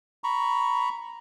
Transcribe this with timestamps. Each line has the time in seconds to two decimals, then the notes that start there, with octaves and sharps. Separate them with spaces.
0.24 A#5 B5 C#6